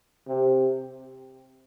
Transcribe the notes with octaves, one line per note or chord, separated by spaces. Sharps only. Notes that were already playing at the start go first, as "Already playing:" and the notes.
C3